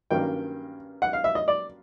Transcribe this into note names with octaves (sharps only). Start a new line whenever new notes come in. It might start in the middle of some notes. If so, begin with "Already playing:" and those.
G2 D#3 F#3 A#3 C#4 G5
F#5
F5
E5
D#5
D5